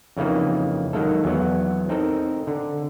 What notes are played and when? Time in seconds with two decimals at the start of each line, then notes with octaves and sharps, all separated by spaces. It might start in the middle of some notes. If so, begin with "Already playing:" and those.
0.17 F2 C#3 E3 A#3 D#4
0.93 D#3 F#3 G#3 A#3 A4
1.24 E2 F#3 B3
1.89 C4 D#4 A4 A#4
2.47 D3